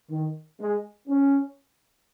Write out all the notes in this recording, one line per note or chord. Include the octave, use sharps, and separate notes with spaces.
D#3
G#3
C#4